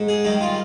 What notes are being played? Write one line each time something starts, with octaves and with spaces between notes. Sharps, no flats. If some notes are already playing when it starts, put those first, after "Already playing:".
Already playing: G#2
G#4
D#3 G3 D#4
F4